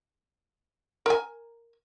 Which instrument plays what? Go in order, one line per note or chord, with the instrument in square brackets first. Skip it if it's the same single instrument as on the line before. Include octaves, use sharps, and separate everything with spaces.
[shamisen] A#4 G#5